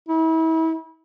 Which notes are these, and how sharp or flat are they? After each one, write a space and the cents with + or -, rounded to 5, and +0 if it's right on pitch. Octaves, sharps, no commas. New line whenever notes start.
E4 -35